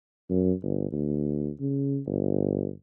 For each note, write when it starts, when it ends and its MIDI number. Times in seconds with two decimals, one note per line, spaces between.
0.30 0.53 42
0.62 0.90 31
0.92 1.49 38
1.60 1.99 49
2.06 2.71 31